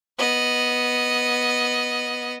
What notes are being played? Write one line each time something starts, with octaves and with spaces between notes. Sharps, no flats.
B3 D#5